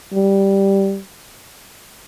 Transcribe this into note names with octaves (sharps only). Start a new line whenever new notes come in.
G3